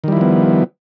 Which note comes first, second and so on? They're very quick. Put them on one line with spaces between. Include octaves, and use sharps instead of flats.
D#3 G3 E4 F3 B3